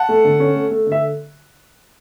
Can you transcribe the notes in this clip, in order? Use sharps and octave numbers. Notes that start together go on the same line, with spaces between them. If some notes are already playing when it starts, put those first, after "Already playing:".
Already playing: F#5 A5
A3
D3
C#4
A3
A3
D3
E5